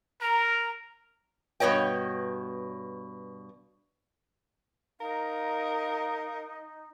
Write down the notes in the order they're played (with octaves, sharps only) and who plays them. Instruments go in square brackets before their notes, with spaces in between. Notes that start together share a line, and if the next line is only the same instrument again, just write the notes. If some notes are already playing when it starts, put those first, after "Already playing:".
[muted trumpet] A#4 [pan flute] A#5
[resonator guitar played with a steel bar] G2 B2 C#5 D#5 G5
[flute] D#4 [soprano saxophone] A#4 [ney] F5